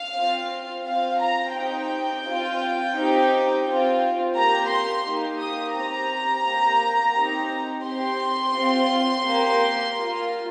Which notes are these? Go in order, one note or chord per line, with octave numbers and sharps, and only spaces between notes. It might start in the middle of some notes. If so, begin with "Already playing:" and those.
Already playing: F5
C4 F4
C4 F4 F5
A#5
C4 D#4 G4 G5
C4 F4
C4 D#4 G4
C4 F4
A#3 G4 A#5
C6
A#3 D#4 G4
D#6
C4 G4 A#5
A#3 G4
C4 D#4 G4
C4 G4 C6
C4 F4
A#3 G4
A#3
F4